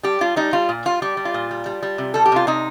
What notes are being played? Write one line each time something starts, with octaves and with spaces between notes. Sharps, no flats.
G3 G4
G3 F4
G3 D#4
G3 F4
A#2
G3 F4
G3 G4
G3
F4
A#2
G3
G3
G3
C3
G3 A4
G4
C3 F4
C3 D#4